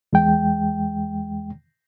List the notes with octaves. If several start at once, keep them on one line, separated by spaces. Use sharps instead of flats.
E2 G#3 G5